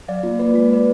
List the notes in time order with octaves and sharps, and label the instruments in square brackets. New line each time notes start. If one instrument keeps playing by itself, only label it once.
[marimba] F#3 [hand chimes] D5 F5
[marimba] A#3 [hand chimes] F4
[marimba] A#3 [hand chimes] B4 D5
[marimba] G#3 [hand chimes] F4
[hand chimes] B4 D5